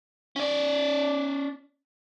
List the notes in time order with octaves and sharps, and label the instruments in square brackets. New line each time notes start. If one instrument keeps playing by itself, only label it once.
[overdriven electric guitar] C#4 D5